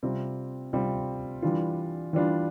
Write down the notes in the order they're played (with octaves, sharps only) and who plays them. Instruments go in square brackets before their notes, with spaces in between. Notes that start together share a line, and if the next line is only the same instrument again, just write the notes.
[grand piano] C3 G3 C4 F4
C3 G3 C4 F4
E3 G3 D4 F4
E3 G3 D4 F4